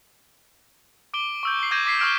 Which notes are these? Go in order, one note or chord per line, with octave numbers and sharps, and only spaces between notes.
D6 D7 G7
C#6 E6 G6
C7 G7
D6 G6 G#6 A#6 D#7 E7
D6 B6 C7
C#6 E6 F6 D7 E7